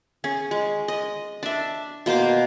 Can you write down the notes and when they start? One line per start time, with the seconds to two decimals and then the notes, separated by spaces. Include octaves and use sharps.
0.24 C#4 G#4
0.51 G#3
0.88 D#5
1.43 D4 E5
2.06 B2 A#3 C5 D6